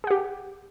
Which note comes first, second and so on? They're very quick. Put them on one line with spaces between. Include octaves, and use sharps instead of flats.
G#4 F#5 G4